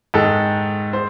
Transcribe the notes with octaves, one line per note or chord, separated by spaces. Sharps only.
G#2 D#3 G#3 A4
C5